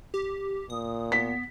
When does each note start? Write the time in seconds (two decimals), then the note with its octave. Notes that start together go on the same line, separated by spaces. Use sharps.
0.14 G4
0.70 A#2 D#6
1.12 B3 B6